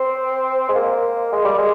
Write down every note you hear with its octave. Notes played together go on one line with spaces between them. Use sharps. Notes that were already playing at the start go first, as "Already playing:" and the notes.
Already playing: C4
G#3
A#3
G#3
G3
G#3